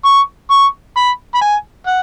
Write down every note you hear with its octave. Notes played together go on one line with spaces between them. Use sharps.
C#6
C#6
B5
B5
G#5
F#5